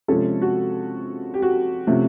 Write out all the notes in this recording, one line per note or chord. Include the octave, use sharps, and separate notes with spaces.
C3 F3 G#3 C#4 A4
F#4
G4
F#4
C3 F3 A3 C#4